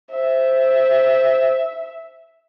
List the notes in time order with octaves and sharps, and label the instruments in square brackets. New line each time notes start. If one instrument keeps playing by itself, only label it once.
[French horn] C5 [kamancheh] E5